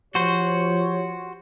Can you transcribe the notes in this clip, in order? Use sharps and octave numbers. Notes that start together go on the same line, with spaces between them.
F3 F#4 G4 C5 C#5